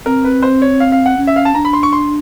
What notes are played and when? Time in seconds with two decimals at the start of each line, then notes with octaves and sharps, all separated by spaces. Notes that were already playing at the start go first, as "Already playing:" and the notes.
0.05 C4 A#4
0.25 B4
0.43 C5
0.62 C#5
0.80 F5
0.92 F5
1.06 F#5
1.17 C#4
1.27 E5
1.36 F5
1.45 A5
1.55 D4 A#5
1.65 B5
1.73 C6
1.83 C#6
1.93 C6